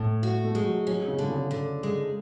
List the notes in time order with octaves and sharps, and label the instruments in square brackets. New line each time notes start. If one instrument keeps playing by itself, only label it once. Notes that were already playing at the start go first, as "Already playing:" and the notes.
Already playing: [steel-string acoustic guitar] A2 [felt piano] A3
[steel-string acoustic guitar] F#4
[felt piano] A3
[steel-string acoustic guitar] G#3
[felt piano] F#3
[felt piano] F#3 [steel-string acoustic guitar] C#4
[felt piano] C#3
[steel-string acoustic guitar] D3
[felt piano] C#3
[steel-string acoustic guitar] D3
G#3